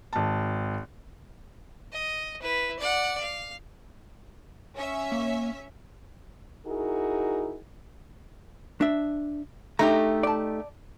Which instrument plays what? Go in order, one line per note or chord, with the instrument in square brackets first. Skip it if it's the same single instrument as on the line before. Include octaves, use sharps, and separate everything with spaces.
[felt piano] G#1 A5
[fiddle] D#5
E4 B4
D5 F#5
F5
[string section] C#4 E5
[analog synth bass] A#3
[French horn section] D#4 E4 F#4 G#4 A#4
[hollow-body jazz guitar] D4 E5
[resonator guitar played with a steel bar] A3 D#4 G4 [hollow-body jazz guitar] A#5
[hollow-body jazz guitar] D5 A5